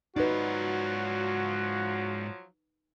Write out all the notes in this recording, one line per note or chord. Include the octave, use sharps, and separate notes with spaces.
G#2 F3 F#3 D#4 F#4 B4 D5